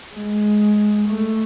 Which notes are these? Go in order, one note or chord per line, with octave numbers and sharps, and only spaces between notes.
G#3
A3